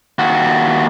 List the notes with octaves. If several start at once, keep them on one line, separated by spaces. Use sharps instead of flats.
D#2 F#4